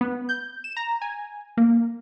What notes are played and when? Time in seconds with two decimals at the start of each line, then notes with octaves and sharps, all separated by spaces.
0.01 B3
0.29 G6
0.64 E7
0.77 A#5
1.02 G#5
1.57 A#3